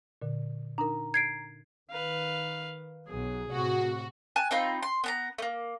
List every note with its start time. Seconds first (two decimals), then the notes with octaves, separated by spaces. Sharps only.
0.22 A#2 D3
0.78 D4 D#4 A#4 A#5
1.14 G#6 C7 D7
1.90 D#3 B4 F5
3.08 B1 F#3 G#4
3.52 A2 C3 F#4
4.36 G#5 A5 F#6
4.51 C4 D#4 F4 B5
4.83 C6
5.04 B3 A5 A#5
5.38 A3 A#3